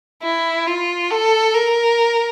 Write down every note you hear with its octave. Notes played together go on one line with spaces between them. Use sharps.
E4
F4
A4
A#4